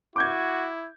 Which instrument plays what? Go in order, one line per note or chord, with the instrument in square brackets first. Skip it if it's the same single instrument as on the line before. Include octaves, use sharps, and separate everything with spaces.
[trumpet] E4 [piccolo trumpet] F#4 [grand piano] D6 G6 G#6